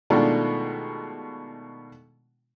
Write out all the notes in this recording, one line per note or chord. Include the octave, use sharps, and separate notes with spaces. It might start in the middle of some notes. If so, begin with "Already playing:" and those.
B2 D#3 G#3 A3 D4 F4